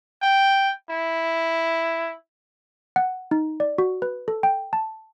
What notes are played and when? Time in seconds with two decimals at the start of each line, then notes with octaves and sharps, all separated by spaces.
0.22 G5
0.90 E4
2.96 F#5
3.31 D#4
3.60 D5
3.78 F#4
4.02 B4
4.28 A4
4.43 G5
4.73 A5